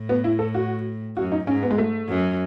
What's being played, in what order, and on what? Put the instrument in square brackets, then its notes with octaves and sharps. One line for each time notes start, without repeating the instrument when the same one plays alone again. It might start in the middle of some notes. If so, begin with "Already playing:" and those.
Already playing: [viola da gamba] A2
[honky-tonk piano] B3
E4
A4
F#4
[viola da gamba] F#2 [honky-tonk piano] F#4
[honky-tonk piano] D#4
[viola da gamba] G#2 [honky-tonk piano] C#4
[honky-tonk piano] B3
G#3
A3
[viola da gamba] F#2